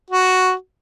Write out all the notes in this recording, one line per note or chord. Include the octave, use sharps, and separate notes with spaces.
F#4